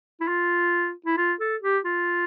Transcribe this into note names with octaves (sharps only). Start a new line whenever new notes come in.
E4
F4
E4
F4
A4
G4
F4